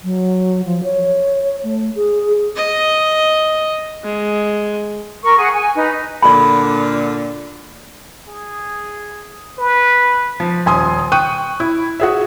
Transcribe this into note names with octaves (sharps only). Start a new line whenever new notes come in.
F#3
F3
C#5
A3
G#4
D#5
G#3
A#4 C#6
G#4 F#5 G#5
G#5
D#4 B4
A#2 D3 D5 B5
G#4
B4
F3
D#1 G#5 C6 D#6
G5 C#6 F#6 D#7
E4
F#4 G#4 E5